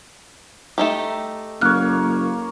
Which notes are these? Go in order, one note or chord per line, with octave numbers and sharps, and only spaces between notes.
A3 D#4 G4
F#1 A#3 C#5 F6 F#6